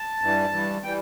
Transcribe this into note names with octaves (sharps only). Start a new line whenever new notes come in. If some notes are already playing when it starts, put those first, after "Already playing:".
Already playing: A5
G2 E3 G3
G2 E3 G3
E3 G3 G5